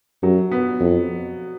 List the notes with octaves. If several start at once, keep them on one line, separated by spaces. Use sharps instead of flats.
F#2 F#3
B3
F2